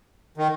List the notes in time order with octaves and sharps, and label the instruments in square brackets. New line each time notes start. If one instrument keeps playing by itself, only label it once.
[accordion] D#3